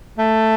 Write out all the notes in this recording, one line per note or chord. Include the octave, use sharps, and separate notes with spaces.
A3